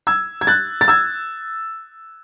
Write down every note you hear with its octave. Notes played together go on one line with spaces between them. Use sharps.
E6 G#6
G#6
F#6 A6
A6
E6 G#6